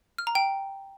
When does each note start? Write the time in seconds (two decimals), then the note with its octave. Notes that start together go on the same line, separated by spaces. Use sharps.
0.18 F6
0.27 A#5
0.35 G5